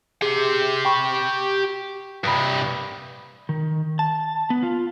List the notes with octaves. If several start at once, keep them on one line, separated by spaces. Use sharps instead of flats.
G4 G#4 C6
G5 B5 C#6
G2 C3 B5 D#6
D#3
A5
B3
F4